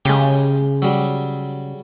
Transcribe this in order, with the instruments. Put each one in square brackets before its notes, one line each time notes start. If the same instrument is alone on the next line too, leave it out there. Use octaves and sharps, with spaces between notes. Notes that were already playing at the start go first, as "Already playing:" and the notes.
[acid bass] C#3 [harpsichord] G#3 G4
[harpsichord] F#3 G3